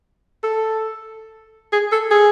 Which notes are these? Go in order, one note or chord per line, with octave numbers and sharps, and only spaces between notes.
A4
G#4
A4
G#4